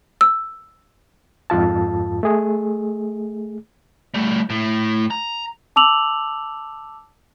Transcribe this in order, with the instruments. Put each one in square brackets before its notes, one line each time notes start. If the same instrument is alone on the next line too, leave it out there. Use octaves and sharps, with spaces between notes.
[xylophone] E6
[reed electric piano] F2 G#2 F4 A5
A3 G#4
[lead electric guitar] G3 A3
A2
A#5
[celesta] A5 D6 E6 F7 F#7